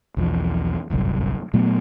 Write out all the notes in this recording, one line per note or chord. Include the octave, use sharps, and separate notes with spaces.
B1 E2 F3
D1 G1 C2 F#2
A#2 F#3 A3 B3